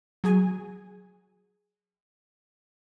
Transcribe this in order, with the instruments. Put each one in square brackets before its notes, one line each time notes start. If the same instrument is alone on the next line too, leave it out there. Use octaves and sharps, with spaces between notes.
[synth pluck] F#3 G#4 G#5